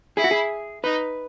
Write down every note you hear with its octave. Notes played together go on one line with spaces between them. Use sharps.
E4 G#4
F#4
G#4
D#4 B4